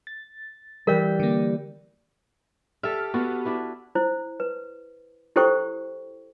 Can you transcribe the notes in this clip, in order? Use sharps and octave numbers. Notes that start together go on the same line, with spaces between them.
A6
E3 G3 A#4 G6 B6
D3 A#3
G4 A4 E5 F6
B3 F#4 A4
D4 E4 B4
E4 C5
B4
E4 G4 A4 C5 G5 C#6